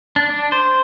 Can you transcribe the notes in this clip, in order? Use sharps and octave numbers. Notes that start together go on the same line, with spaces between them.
D4
D4
C5